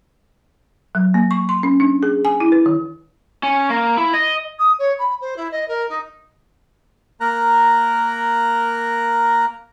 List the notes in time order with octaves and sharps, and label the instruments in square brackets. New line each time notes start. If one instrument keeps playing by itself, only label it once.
[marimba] F#3
A#3
C#6
C6
C#4
D4
G#4
G#5
E4
B4
D#3
[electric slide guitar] C#4
A#3
E4
D#5
[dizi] D#6
C#5
B5
C5
E4
D#5
A#4
D#4
[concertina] A#3 A#4 A#5 F#6